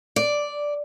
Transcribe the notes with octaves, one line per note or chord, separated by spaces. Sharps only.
D5